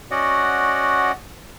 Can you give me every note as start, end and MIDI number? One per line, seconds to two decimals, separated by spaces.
0.11 1.12 61
0.11 1.12 66
0.11 1.12 74
0.11 1.12 75
0.11 1.12 78